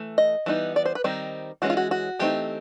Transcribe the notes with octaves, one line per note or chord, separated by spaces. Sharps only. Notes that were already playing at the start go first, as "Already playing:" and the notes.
Already playing: E3 A3
D#5
E3 G3 B3 D#4
D5
C5
B4
D#3 G3 C4 D#4
E3 G#3 C#4 F#4
F4
F#4
F#4
E3 A3 C4 D#4 G4